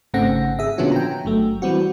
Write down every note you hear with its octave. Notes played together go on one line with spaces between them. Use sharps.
G#1 C#3 A3 C4 F#5 A#6
G#4 E5
A#2 D3 F3 B3 C#4 F#4
G5 A#5
G1 F#3 A3
E3 G3 C4 F#4